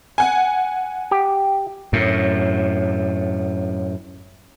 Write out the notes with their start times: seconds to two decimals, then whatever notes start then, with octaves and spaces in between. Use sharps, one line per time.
0.18 F#5 G#5
1.11 G4
1.93 F#2 A2